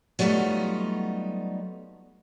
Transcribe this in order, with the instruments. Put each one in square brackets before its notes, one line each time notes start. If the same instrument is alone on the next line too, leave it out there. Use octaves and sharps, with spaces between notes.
[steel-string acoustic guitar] F#3 G3 A3 B3 D#4 F4